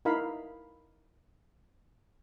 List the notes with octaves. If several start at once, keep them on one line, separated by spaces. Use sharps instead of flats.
D#4 E4 A#4 F5 B5